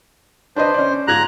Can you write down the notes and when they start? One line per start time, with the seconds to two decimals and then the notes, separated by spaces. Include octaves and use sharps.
0.56 D4 B4 C5 D#5
0.74 C#4 D5
1.08 G#2 F4 A#5 F#6 G#6